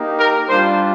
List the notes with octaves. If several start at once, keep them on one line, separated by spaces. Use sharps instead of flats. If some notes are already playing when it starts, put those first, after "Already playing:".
Already playing: A#3 D#4 G4
A#4
G3 D4 F4 C5